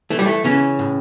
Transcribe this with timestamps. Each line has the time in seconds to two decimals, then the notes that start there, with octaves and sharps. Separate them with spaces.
0.10 E3 A3
0.19 G3
0.26 A3
0.44 C#3 E3 C#4
0.79 A2